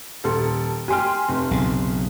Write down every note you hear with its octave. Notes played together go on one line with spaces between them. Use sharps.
D#1 A4 C6
G4 G5 G#5 C6 F6
F1
B1 C#3